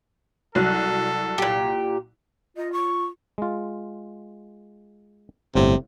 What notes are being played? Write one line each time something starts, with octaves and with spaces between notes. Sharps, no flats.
C2 F#3 A4 F#6
A#2 G4
F4 D#5
C#6
G#3 F4
G1 A2 C3